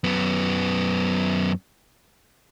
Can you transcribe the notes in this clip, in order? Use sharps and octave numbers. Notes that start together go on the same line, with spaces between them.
F#2 B3